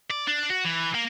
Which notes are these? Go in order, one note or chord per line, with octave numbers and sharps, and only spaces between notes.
D5
D4
F#4
E3
A#3